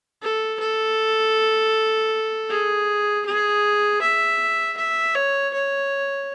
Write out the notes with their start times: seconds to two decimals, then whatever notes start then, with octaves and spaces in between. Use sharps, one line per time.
0.22 A4
0.60 A4
2.50 G#4
3.26 G#4
4.02 E5
4.77 E5
5.15 C#5
5.54 C#5